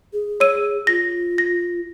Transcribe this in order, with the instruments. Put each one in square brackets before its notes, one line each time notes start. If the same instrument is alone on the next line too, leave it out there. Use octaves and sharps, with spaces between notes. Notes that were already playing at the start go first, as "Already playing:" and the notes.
[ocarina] G#4
[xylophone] C#5 E6 D#7
[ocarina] F4 [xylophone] A#6
[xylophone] A#6